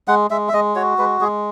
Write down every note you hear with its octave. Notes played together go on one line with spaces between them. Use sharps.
G#3 F#5
G#3 E5
E5
G#3 D#5
F#4 C#5
G#3 B4
G#3 G#4